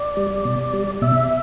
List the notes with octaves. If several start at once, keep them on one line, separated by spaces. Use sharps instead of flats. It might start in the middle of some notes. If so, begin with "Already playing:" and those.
Already playing: D5
G3
B2
G3
B2 E5